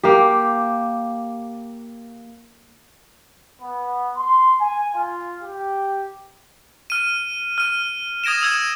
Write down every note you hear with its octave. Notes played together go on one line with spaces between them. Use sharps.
A#3 G4
B3
C6
G#5
F4
G4
F6 D#7
F6 D#7
D#6 G#6 A#6 D7 E7
D#6 E6 G#6 E7